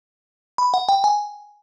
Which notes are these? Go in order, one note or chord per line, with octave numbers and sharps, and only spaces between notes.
B5
F#5
G5
G#5